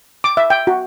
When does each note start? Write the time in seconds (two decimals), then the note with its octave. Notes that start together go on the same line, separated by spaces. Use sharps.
0.24 D6
0.37 E5
0.50 G5
0.67 F#4